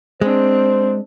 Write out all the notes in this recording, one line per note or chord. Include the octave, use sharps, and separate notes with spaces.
G#3 C4 D4 C5